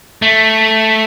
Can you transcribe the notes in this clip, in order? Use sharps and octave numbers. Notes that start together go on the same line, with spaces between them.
A3